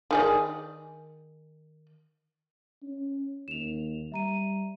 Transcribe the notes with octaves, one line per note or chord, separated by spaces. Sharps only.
D#3 G#4 D5
C#4
D#2 E7 F7
G3 E5 A#5 D#7